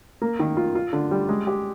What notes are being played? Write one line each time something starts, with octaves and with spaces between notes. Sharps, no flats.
A#3
D#3
F4
F4
D3
G3
G#3
G4